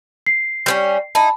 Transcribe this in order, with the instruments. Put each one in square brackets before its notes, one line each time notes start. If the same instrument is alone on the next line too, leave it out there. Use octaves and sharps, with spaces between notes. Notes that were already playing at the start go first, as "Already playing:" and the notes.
[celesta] C7
[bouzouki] G3 B3 C#4
[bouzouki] D#4 E4 [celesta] A5 B5